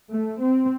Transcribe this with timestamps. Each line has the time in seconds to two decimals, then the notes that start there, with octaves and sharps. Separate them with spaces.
0.11 A3
0.39 C4